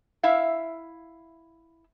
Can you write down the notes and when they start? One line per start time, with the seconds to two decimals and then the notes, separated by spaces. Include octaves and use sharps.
0.23 E4 E5 F5